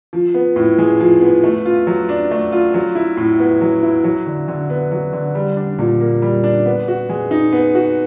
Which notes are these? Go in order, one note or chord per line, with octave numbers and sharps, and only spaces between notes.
F3
B3
A2
G#3
F3
B3
A3
F4
F#3
D4
A3
F4
F#3
E4
A2
B3
F#3
E4
F#3
D3
D3
B3
F#3
D3
G3
D4
A#2
A#3
G3
D4
B3
F#4
G#3
D#4
B3
F#4